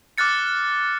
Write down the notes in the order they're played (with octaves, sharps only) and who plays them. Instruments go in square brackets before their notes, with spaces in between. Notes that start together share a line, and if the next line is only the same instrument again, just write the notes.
[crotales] D6 F6 F#6 A6 C#7